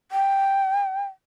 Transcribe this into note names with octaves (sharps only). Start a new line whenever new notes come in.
G5